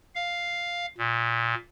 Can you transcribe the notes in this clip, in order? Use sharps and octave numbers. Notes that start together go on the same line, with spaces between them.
F5
A#2